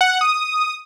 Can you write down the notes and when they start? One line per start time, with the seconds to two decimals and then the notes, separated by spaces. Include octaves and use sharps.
0.01 F#5
0.11 F#5
0.21 D#6